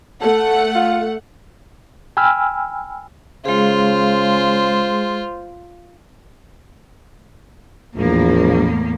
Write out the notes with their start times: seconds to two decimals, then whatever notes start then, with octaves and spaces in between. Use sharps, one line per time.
0.21 A3 A4 F#5
0.75 F4
2.17 G5 G#5 B5 E6 F6
3.45 C#3 G#3 F4 G#4 C5
7.97 A#1 E2 A2 A#3